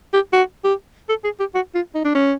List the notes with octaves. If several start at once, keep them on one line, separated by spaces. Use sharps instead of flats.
G4
F#4
G4
A4
G#4
G4
F#4
F4
D#4
D4
C#4